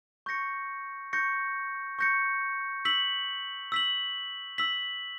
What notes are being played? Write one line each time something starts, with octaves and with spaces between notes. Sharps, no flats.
C#6 G6 A#6 C#7
C#6 G6 A#6 C#7
C#6 G6 A#6 C#7
E6 B6 F#7
E6 B6 F#7
E6 B6 F#7